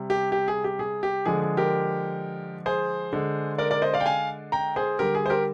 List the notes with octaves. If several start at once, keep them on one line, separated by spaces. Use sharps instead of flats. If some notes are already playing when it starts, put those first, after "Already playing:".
Already playing: C3 G3
G4
G4
G#4
G4
G#4
G4
D3 F3 G#3 G#4
G#4
G4 A#4
G#4 C5
D3 G#3
A#4 D5
A#4 D5
C5 D#5
D5 F5
G5
F5 G#5
G5 A#5
G#4 C5
D3 G3 G4 A#4
G#4
C5
G4 A#4